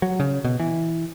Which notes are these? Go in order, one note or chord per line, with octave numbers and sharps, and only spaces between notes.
F#3
C#3
B2
E3